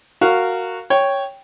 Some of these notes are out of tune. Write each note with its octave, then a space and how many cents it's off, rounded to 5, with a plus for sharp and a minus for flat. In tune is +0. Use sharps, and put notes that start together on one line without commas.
F#4 +0 A#4 -15 F5 +0
C#5 +0 G5 +0